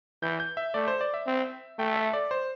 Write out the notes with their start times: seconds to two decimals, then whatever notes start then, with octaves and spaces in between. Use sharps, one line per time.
0.22 E3 G6
0.40 G6
0.57 E5
0.74 A3 D5
0.88 C5
1.01 D5
1.14 E5
1.27 C4
1.79 A3 G5
1.96 E5
2.13 D5
2.31 C5